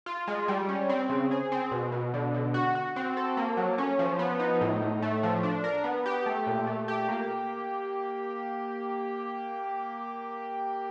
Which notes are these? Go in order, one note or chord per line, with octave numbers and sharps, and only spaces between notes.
F4
G#3
G3
C#4
C4
C#3
G#4
C4
B2
B2
D3
D3
F#4
F#4
C4
A4
A#3
F#3
C#4
F3
B3
D#4
A2
A2
A3
F3
D4
A#4
B3
G4
A3
A#2
A3
G4
A#3